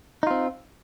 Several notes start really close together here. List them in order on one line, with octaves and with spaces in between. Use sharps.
D#4 F4 C4